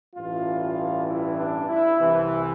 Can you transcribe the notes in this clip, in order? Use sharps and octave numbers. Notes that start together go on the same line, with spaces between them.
A1 G2 E3 F4
F4
E4
D4
E4
C2 C3 E3